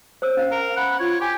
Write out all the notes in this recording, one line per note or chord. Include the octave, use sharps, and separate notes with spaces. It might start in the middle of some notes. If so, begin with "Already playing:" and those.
C5 C#5 E6
C#4 F5
A#4
F#5 B5
F4 C#5
G4 G#5